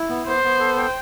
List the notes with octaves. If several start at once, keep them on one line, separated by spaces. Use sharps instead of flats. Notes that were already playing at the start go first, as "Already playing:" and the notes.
Already playing: E4
B3
B3 C5
B3
A4
G5